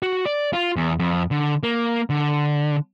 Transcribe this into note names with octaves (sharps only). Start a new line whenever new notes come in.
F#4
D5
F4
E2
F2
D3
A#3
D3